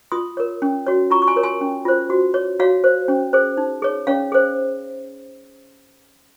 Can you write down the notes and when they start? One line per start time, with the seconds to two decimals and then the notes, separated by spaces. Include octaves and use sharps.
0.12 F4 C6 D#6
0.37 A#4 C#5
0.62 C#4
0.87 F#4 C#5
1.10 F4 A#5 C#6
1.22 C#6
1.27 G#5 C6
1.36 A#4 C#5
1.43 G#5 C6
1.61 C#4
1.85 F4 C5
2.10 F#4
2.34 C#5
2.60 F#4 C#5 F5
2.84 C5
3.08 C#4
3.33 G#4 C5
3.57 D#4
3.82 G#4 C#5
4.07 C#4 C#5 F5
4.32 G#4 C5